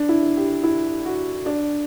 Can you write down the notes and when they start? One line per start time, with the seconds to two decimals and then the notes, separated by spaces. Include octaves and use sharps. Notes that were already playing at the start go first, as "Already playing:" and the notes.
Already playing: D4
0.09 E4
0.37 G4
0.63 E4
1.05 F#4
1.46 D4